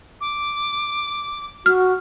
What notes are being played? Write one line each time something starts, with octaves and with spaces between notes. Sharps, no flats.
D6
F#4 F6